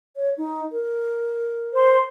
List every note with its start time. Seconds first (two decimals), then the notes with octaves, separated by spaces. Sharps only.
0.16 C#5
0.38 D#4
0.72 A#4
1.75 C5 C6